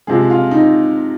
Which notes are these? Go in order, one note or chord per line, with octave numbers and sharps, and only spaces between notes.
C3 F3 G#3 G#4
F4
D#4